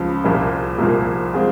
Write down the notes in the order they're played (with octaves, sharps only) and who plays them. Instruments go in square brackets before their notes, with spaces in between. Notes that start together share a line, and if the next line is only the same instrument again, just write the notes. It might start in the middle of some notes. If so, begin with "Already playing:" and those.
Already playing: [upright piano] C#2 C#3 F3
C2 A#2 F3 A#3
C2 A#2 F3 A#3
G#3 C4 F4 G#4